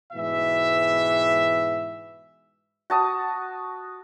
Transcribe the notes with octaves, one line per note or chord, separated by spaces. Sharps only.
G#2 B2 E3 E5
F#4 A5 D#6